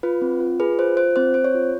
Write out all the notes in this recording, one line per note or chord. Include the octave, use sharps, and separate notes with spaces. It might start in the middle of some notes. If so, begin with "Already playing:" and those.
F4 B4
C4
F4
G#4 B4
F4 C5
F4 C5
C4 C5
C4 C5
C#5
F4